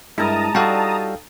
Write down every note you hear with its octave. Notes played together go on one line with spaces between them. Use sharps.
G2 G#3 E4 A#4 A5 A#5 D#6
G3 D#4 F4 F#4 A4 F5 G5